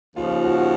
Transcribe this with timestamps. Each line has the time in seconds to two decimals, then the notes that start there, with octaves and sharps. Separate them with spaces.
0.16 D#2 C#3 F3 F4
0.44 F#4
0.58 F#4